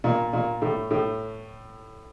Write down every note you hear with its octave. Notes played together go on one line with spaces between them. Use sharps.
A#2
A#2
A2
A2